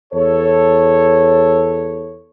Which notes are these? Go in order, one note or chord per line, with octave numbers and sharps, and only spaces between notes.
E2 A4 C#5